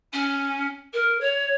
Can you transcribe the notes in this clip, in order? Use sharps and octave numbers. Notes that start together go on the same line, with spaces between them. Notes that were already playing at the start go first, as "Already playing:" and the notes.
C#4
A#4
C#5